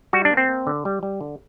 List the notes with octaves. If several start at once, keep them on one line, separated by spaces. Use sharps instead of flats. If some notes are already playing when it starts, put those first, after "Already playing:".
G3 F#4
D4
A#3
C4
A#3
D3
G3
G3
D3